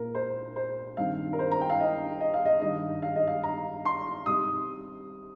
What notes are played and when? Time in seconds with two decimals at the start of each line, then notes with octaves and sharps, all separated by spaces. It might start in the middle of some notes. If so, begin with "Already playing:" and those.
Already playing: A#2 A#3 A#4
0.15 C5
0.56 C5
0.97 G2 D#3 C4 F5
1.33 A#4
1.39 C5
1.51 A#5
1.61 G5
1.70 F5
1.80 D#5
2.21 D#5
2.34 F5
2.45 D#5
2.62 G2 D#3 G3 D#4 D#5
3.02 F5
3.16 D#5
3.27 F5
3.43 A#5
3.85 C6
4.26 C3 G3 D#4 D#6